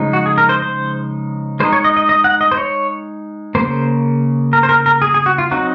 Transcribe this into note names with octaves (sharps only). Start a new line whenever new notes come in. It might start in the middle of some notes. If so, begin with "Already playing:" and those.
Already playing: C#3 F3 G#3 D#4
F#4
G#4
A#4
C5
C5
G#3 D#4 C5
C#5
D#5
D#5
D#5
F#5
D#5
C5
C#5
C#3 F3 A#3 C5
A#4
C5
A#4
A#4
G#4
G#4
F#4
F4
F#3 C4 D#4 F#4